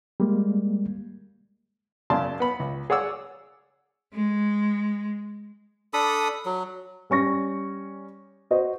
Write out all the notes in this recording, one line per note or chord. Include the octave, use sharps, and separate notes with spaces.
G3 G#3 A#3
F#2 C#3 D5 A5 C6
B3 B5
C#2
G#4 C#5 D5 F#5 D6 E6
G#3
D4 A4 B5 D#6
F#3
G3 C#4 C#6 A#6
F#4 C5 D#5